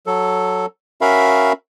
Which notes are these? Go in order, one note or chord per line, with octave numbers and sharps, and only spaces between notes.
F#3 A4
C#4 F#4 A#4 E5 F5 B5